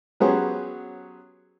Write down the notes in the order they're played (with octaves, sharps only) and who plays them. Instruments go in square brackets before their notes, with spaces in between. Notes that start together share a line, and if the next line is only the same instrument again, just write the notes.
[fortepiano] F#3 B3 C#4 G4 G#4 C5